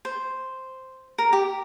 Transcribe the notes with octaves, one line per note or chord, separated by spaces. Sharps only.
C5
A#4
G4